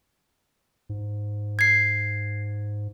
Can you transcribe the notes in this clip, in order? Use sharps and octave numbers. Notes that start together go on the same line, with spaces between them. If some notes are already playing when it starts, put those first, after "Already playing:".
G#2
G#6 C7